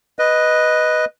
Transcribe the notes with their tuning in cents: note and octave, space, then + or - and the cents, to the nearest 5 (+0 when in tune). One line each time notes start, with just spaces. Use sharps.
B4 +0 D#5 +0